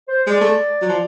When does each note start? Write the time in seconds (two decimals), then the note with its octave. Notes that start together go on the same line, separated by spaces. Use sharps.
0.08 C5
0.27 G#3 D5
0.41 A3
0.82 F#3
0.89 F3